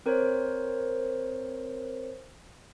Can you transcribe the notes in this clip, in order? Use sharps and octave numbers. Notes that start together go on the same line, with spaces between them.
C4 A#4 C5 C#5